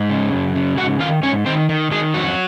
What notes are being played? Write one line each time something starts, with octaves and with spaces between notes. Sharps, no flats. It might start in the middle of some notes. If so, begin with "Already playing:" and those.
Already playing: G#2
C#3
F#2
C#3
G#2 F#4 F#5
D#3 F4 F5
G#2 C#4 C#5
D#3 C4 C5
D#3
D#3 G#3 G#4
F2 F#3 F#4